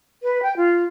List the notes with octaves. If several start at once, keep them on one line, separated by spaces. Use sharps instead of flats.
B4
G5
F4